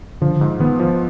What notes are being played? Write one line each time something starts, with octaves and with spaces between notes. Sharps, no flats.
D3 F3
G#2
D#3 B3
F3